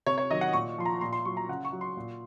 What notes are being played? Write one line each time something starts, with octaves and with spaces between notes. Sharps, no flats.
C3 C#5
C#5
D#3 F#3 D#5
F#5
A#2 C#6
F3 C6
A#5
A#2 C6
C6
F#3 C#6
A#5
C#3 F#5
C#6
F#3
C6
A#2